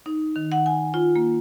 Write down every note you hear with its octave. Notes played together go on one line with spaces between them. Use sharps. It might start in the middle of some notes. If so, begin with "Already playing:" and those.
D#4
D#3
F#5
G#5
F4
A#3